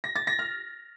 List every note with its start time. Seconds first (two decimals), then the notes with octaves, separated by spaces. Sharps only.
0.04 A#6
0.16 A6
0.27 A#6
0.39 F6